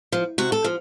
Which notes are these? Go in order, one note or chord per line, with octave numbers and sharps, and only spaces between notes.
F3
C3 F#4
A4
F3